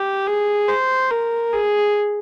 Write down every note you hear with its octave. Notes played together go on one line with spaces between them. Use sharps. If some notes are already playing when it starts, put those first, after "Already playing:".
Already playing: G4
G#4
C5
A#4
G#4